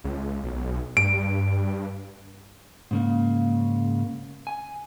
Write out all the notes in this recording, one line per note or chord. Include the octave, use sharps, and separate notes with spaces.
C#2
B1
G2 D7
G#2 C#3 A#3
G#5